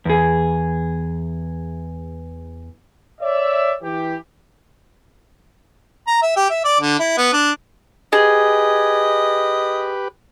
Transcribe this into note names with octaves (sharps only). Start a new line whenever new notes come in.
E2 G#4
C#5 D5 E5
E3 G4
A#5
E5
G4
E5
D5
D3
E4
B3
D4
G4 G#4 B4 D#5